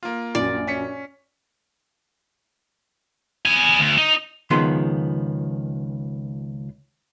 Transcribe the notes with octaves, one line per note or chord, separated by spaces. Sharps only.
A#3 F4
A#1 F#2 D5
C#4 B6 C#7
B3 G#5
D2
D#4
C#2 D#3 F3 B3 G#4 C6